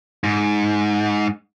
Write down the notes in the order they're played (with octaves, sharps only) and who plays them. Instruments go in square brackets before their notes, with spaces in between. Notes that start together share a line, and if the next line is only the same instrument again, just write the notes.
[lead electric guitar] G#2